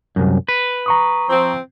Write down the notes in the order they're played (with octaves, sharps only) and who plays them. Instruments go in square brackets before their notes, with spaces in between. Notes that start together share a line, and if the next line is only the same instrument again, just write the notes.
[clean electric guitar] C2 F#2
B4
[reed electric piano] A#5 C#6 D#6
[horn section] F3 C4